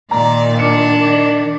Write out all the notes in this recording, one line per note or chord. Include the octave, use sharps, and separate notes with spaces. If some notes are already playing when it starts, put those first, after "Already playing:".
A#2 D#3 D5 A#5
D4 D5 C#7
D#3